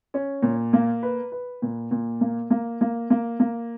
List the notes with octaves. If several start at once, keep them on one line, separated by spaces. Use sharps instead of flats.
C#4
A#2
A#3
B4
B4
A#2
A#2
A#3
A#3
A#3
A#3
A#3